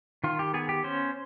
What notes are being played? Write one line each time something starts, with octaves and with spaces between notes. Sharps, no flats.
D#3 F4
G4
B3 G#4
G4
C#4 C5